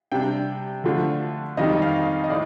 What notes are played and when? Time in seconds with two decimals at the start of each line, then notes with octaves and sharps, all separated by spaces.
0.12 C3 G3 D4 G5
0.84 D3 F3 A3 D4 F4
1.57 F2 D#3 G3 D#5
1.82 F5
2.24 D#5
2.30 A2 D5